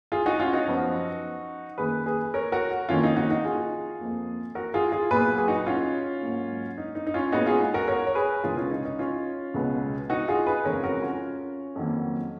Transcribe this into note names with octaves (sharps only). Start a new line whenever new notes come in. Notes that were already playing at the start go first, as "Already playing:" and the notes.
F4 G#4
D#4 F#4
C#4 F4
D#4 F#4
F#2 F3 B3
F#2 D#3 A#3 G#4 B4
G#4 B4
A#4 C#5
F#4 A#4
F2 D#3 A#3 C#4 F4
D#4
D#4 F#4
D#4 F#4
F4 G#4
F2 F3 A#3
F#4 A#4
F4 G#4
F4 G#4
A#2 F#3 B3 G#4 B4
G#4
D#4 F#4
C#4 F4
G#2 F#3 A#3
D#4
D#4
D#4
C#4 F4
A#2 G#3 B3 D#4 F#4
F4 G#4
F#4 A#4
A#4 C#5
C#5
G#4 B4
C#2 C#3 G#3 B3 F4 G#4
C#4 F4
D#4
D#4
C#4 F4
C#2 B2 G#3 B3
D#4 F#4
F4 G#4
G#4 B4
F2 C#3 G#3 A#4 C#5
F#4 A#4
C#4 F4
F2 D#3 F#3 A#3